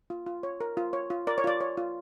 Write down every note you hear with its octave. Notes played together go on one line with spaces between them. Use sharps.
F4
F4
C#5
A#4
F4
C#5
F4
A#4 D5
C#5
F4 D5
C#5
F4